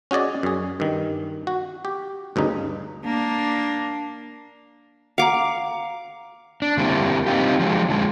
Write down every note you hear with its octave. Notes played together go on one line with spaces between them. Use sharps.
C#4 F#4 G#4 D5 D#5
F#2 G#4
G2 D#3
F#4
G4
D2 G2 C#3 D#4
A#3 D4
F5 F#5 A#5 D6
D4
D3 G3 A#3 C4 E4
C4 D#4 F4 G4
F3 F#3 G#3
D3 F3 G#3